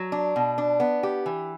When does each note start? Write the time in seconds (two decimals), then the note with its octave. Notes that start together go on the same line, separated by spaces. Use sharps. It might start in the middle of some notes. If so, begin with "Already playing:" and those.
Already playing: F#3
0.12 D4
0.36 B2
0.58 D4
0.80 B3
1.03 G4
1.26 E3